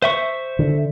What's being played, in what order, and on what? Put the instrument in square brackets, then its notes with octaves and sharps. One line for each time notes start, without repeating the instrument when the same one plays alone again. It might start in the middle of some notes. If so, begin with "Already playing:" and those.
[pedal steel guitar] C5 E5 C#6
[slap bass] D3